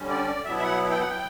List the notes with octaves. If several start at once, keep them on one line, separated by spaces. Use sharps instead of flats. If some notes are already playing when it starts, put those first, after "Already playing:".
Already playing: D3 G3 C#4
D5
B2 F#3 B3 E4 E5
E5
F#5
G5
F#5
G5